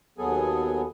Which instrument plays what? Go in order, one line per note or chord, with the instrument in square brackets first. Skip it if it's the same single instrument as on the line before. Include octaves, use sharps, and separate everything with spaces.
[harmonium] D#2 F#3 B3 G#4 A4 G#5